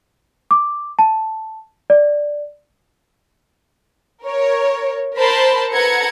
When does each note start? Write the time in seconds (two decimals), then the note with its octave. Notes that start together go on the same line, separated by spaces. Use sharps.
0.51 D6
0.99 A5
1.90 D5
4.25 A#4 C#5
5.17 A#4 C5 A5 B5 C6
5.73 A4 B4 F#5 A#5 G#6 C#7